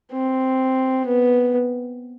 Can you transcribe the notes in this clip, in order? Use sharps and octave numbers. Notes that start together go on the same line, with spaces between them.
C4
B3